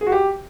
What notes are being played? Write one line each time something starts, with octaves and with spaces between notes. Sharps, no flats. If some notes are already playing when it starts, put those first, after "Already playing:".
G#4
F#4
G4